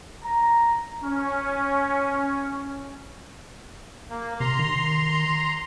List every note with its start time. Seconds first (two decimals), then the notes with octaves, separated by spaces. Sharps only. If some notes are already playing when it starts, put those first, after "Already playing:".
0.24 A#5
1.03 C#4
4.10 A#3
4.40 C3 A#5 C6
4.59 D#3